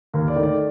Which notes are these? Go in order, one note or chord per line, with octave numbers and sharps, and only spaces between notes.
D#2 A#4
D5
D#3 A3
D5